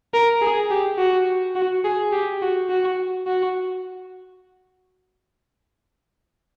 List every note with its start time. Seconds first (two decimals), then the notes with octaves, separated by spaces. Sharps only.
0.14 A#4
0.41 G#4
0.71 G4
0.98 F#4
1.56 F#4
1.85 G#4
2.12 G4
2.42 F#4
2.69 F#4
3.27 F#4